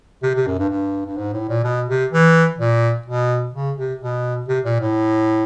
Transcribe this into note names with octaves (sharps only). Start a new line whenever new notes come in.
C3
C3
F#2
G2
G2
G2
G#2
A2
A#2
B2
C3
E3
A#2
B2
C#3
C3
B2
C3
A#2
A2